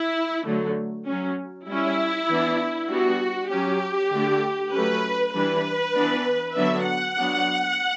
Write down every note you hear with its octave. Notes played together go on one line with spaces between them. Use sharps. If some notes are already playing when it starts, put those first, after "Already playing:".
Already playing: E4
D3 F#3 A3
F#3 C#4
G3 C#4 E4
E3 B3 D4
G3 B3 D4 F#4
F#3 C#4 G4
D3 A3 D4
F#3 A3 C#4 B4
E3 G3 D4 B4
E3 B3 D4
D3 F#3 B3 D4 E5
F#5
F#3 B3 D4